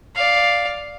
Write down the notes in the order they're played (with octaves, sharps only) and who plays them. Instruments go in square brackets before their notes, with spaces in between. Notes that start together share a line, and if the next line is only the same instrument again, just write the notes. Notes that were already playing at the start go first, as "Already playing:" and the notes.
[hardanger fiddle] D5 F5